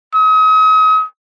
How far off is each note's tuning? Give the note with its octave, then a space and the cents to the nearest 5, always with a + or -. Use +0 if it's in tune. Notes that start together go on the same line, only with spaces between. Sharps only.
D#6 +40